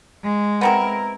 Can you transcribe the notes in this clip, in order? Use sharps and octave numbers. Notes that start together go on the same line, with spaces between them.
G#3
B3 C4 E4 A#4